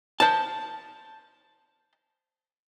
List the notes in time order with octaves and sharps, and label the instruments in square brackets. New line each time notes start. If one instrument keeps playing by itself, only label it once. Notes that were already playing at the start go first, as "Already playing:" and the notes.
[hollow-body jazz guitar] C5 A5